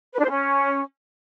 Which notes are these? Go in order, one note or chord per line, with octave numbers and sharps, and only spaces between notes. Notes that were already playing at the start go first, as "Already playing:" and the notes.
B4
D4
C5
C#4